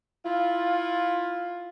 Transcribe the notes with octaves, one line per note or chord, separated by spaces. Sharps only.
E4 F4